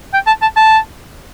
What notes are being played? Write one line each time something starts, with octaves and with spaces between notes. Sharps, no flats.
G5
A5
A5
A5